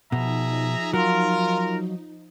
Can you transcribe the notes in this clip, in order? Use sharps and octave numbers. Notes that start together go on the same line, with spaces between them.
B2 F3 D#4 G#4 E5 A#5
F#3 F4 A#4